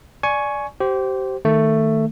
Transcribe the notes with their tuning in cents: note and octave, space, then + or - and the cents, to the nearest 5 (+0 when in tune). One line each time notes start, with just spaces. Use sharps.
D5 +0 G#5 +15 C#6 +0
G4 -30 C5 +0
D#3 +5 A3 +10